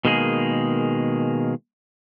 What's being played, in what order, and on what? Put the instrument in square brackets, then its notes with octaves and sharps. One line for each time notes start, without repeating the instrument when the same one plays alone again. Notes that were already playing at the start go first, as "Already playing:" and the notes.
[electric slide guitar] B2 D#3 G#3 A#3 G#4